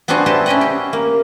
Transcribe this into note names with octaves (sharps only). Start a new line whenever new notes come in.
B3 C4 D4 F#4 G#4 C5
E4 F#4 G4 C5 D#5 A5
C#4 E4 D#5 F#5
G4
A#3